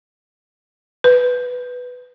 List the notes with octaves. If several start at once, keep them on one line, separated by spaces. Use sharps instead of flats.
B4